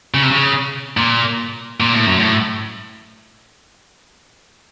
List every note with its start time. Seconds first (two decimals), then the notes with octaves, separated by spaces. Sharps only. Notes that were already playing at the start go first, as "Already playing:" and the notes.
0.14 C#3
0.23 C3
0.31 C#3
0.97 A#2
1.80 A#2
1.93 A2
2.06 F#2
2.20 A2